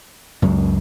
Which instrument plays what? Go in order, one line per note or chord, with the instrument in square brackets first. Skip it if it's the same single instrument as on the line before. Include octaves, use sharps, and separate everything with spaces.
[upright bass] C#2 [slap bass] F#2 F#3 G#3